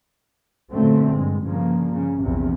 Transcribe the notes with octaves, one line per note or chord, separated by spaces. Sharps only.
F#2 A#2 D3 A3 C4
G2 G#3
G2 C#3 F3 A#3
C#3
A#1 E2 C3